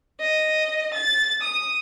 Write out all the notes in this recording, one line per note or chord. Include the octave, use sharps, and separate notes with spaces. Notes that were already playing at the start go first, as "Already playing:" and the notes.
D#5
A6
D#6